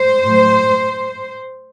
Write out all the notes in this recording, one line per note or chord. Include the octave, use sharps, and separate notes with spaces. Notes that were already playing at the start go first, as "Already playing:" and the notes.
Already playing: C5
A2 F#3 A3